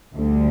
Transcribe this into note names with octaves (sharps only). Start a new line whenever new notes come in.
D2 D3 G3